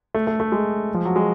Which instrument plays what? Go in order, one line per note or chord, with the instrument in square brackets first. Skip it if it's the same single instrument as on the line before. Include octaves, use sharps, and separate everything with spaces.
[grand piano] A3
A3
A3
G#3
F3
F#3
G#3